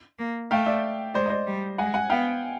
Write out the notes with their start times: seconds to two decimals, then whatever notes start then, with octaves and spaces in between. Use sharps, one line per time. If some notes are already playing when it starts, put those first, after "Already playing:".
0.19 A#3
0.51 A3 F5 G5
0.66 D5 E5
1.14 G#3 C5 D5
1.26 D#5
1.30 C5 D5
1.47 G3
1.78 G#3 F#5 G#5
1.94 F#5 G#5
2.10 B3 F5 G5